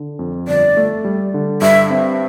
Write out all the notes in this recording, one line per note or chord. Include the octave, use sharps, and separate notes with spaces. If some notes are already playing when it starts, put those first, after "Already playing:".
Already playing: D3
F2
G1 D5
A3
G3
D3
G2 E5
C4